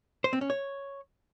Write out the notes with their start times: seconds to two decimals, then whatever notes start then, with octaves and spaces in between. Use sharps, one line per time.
0.24 C5
0.33 C4
0.41 C#4
0.50 C#5